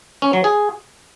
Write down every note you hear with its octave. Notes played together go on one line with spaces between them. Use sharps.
C#4
F#3
G#4